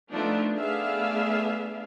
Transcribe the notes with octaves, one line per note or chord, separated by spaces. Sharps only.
F3 A3 B3 D4 D#4
A3 B3 D4 G#4 E5 F5